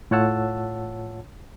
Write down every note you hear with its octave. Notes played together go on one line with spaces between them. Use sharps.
A2 F4 C#5 F#5 A5 E6